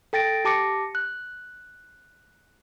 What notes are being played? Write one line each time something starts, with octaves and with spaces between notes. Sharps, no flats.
A4 G5 A6 A#6 D7
G4 A5 D6 A#6 C#7
F#6